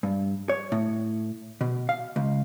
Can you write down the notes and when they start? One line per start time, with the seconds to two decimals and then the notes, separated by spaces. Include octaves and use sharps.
0.03 G2
0.49 C#5
0.72 A2
1.61 B2
1.89 F5
2.16 C#2